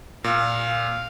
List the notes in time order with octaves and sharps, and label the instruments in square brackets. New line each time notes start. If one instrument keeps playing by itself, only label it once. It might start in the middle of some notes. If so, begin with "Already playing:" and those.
[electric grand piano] A#2 [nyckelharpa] F5